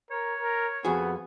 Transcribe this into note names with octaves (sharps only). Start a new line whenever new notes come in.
A#4 C#5
A#4
F2 B3 F#4 G#4